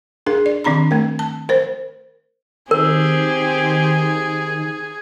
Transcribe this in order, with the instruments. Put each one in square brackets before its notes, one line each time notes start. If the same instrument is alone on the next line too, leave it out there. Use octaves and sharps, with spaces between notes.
[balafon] D4 G#4 A#4
D5
D#3 C4 D4 A#5 B5
A3 A#4
A5
A#4 C5
[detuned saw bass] D#3 [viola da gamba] C4 G4 [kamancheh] G#4 [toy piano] A#4